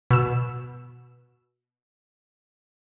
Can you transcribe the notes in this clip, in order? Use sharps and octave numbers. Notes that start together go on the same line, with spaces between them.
B2 E6